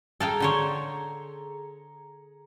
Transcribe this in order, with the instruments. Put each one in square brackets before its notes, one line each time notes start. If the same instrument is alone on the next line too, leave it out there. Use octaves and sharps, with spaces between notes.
[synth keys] G#4 A#5 C#7 [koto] A4 F5 G5
[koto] D3 C5 C#5